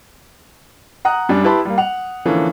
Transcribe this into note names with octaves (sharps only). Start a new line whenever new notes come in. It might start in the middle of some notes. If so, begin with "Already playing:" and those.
F#5 A#5 D#6 F#6
F#2 G3 D4
E4 G4 B4 A5 B5 C6
G3 A#3
F#5 F7
D3 E3 F3 A#3 C#4